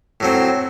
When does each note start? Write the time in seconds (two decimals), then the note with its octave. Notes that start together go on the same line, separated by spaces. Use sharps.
0.20 A2 F#3 C4